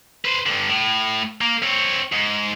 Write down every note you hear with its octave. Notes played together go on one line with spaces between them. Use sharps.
B4 C5
G2 D3
A2
A#3
C4 C#5
G#2